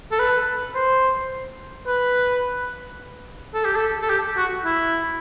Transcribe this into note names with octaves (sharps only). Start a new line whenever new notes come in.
A4
B4
C5
B4
A4
G4
A4
A4
G4
F#4
E4